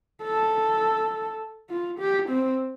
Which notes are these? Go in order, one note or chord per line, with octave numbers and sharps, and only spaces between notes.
A4
F4
G4
C4